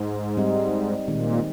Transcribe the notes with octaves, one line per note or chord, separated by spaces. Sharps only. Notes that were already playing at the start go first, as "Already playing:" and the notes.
Already playing: G#2
G3 C4 D#4
A#2 D#3 G#3 C4 D#4